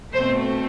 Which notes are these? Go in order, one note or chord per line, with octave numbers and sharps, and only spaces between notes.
B2 A3 C4 C5